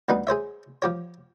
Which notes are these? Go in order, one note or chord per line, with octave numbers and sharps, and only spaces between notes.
D2 G3 B3 D#4 B4
G#4 C5 C#5 E5
F3 G4 C#5